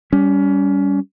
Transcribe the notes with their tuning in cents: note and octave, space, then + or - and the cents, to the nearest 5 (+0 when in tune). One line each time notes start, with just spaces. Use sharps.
G3 +0 C#4 +25